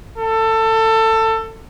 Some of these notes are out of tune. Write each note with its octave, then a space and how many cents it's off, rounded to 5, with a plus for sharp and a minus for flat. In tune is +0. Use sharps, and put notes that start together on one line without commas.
A4 +20